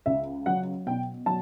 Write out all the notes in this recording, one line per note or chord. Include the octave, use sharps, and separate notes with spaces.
C#2 E5
F#3 F#5
B2 G5
F#3 A5